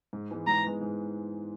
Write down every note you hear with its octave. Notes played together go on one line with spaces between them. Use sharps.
G#2
E3 G#3 B3
G#2 A#5
E3 G#3 B3
G#2